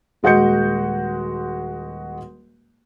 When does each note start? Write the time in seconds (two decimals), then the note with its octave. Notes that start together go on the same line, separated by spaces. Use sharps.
0.23 D#1 G#3 F#4 D#5 G6 C#7